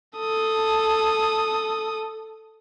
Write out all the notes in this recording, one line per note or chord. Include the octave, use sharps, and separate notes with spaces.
A4 D#6